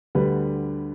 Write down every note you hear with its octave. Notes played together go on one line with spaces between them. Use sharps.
D2 D3 G3 B4